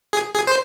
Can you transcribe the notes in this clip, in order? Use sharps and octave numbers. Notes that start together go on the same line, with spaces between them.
G#4
G#4
C5